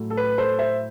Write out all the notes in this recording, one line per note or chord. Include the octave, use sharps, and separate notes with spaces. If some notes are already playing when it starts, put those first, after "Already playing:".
Already playing: A2 F#3 A3
A4
B4
A4 C5
C5 E5